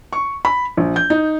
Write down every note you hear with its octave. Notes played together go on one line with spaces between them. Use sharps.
C#6
B5
A#1
G6
D#4